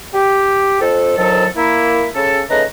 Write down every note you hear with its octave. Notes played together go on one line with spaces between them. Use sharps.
G4
F2 A4
D2 D#3 F3 F#3 A4
A#3 E4
C#3 A4
C#3 A3 D#4 B4 D#5 A#5